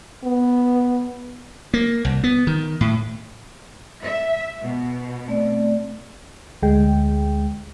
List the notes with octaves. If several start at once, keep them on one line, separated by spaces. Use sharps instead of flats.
B3
A#3
C2
B3
D#3
A2
E5
B2
A3 C4 D5
D2 G#3 G5